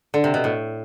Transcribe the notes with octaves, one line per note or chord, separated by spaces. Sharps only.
D3
C3
B2
A2